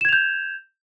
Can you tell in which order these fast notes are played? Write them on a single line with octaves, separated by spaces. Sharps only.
E7 G#6 F7 G6